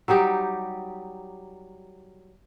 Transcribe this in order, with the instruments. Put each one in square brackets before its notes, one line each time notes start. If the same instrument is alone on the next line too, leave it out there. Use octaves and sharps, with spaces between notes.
[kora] F#3 G3 D#4 G4